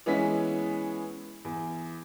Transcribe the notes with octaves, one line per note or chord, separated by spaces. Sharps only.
E3 G#3 B3 C#4 B6
E2